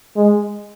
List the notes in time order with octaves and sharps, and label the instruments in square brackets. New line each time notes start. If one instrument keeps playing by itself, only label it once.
[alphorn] G#3